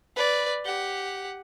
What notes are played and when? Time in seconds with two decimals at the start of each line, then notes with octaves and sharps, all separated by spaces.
0.16 B4 D5
0.65 G4 F#5